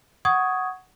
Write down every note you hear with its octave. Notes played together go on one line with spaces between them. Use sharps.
F#5 C#6 D#6 G#6